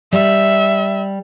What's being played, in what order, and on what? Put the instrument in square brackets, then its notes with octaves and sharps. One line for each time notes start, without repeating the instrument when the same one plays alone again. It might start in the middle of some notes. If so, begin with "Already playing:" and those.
[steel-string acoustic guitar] G3 [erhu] E5